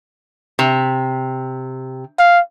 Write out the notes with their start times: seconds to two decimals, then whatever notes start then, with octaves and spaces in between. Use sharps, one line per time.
0.59 C3
2.19 F5